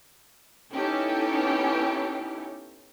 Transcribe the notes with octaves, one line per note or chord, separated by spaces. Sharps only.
B3 C#4 D#4 E4 G4 A4